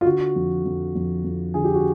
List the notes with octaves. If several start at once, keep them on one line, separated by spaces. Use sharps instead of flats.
F4
D3 F#4
F2
F2
F2
F2
D3 G#4
G4
F#4